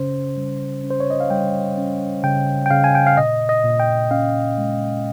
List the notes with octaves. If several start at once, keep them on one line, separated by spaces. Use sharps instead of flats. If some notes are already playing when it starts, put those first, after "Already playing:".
Already playing: C#3 C#4 C5
G3
C#4
C5
C#5
D#5
F5
G3 G5
C#4
C#3 G5
G5
C#3 F5
G#5
G5
F5
A#2 D#5
D#5
A#2
G5
C#4 F5
G#3